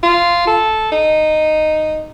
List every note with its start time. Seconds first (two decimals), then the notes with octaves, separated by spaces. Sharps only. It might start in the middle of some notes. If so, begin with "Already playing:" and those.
0.03 F4
0.47 A4
0.92 D#4